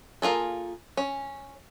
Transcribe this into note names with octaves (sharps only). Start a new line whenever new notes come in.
A#3 F4 G#4 A4
C#4